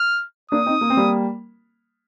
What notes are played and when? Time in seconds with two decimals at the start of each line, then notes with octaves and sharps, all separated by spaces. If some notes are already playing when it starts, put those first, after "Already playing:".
Already playing: F6
0.51 A#3 D4 D#6
0.66 C4 D#4
0.81 A#3
0.90 C4
0.97 G3 A#3